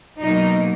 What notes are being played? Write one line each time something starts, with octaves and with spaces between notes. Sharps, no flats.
B2 F#3 A#3 D#4